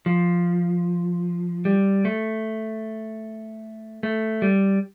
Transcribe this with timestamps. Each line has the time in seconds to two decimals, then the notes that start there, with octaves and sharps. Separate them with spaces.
0.06 F3
1.65 G3
2.05 A3
4.03 A3
4.42 G3